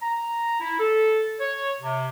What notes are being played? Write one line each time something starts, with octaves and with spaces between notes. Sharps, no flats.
A#5
E4
A4
C#5
C3